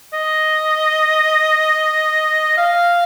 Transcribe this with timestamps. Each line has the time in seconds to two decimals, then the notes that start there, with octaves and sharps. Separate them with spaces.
0.13 D#5
2.58 F5